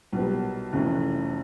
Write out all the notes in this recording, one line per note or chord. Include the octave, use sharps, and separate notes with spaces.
B1 A#2 G3 B3
F1 F2 C#3 E3 A3